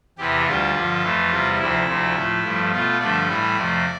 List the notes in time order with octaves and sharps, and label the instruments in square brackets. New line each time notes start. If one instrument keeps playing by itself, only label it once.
[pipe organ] E2 C3 E3 G4
D2 D3 G3 F4
G2 D3 F3
F2 E3 A3
E2 C3 G3
D2 C3 F3 E4
D2 C3 F3 A3
A2 F3 A3
G2 F3 A3
B2 A3 F4
G2 D3 F3 A3 D5
A2 E3 G3
F2 C3 F3 A3